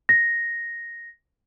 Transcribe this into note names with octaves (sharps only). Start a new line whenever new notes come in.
A#6